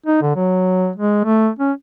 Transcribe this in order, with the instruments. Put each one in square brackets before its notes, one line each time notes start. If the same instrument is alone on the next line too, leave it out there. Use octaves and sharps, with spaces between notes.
[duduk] D#4
D3
F#3
G#3
A3
C#4